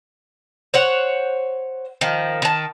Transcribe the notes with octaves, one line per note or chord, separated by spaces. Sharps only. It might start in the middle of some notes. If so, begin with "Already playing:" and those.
C5 C#5 F#5
D#3 F3
D#3 A5